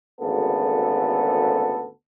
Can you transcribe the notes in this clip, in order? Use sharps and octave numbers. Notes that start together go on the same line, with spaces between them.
G#1 D2 C#3 B3 A4